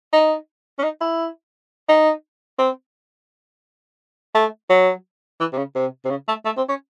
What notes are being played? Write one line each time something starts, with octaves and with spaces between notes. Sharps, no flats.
D#4
C#4
D#4
E4
D#4
C4
A3
F#3
E3
C3
C#3
C3
C3
C#3
A3
A3
C4
C#4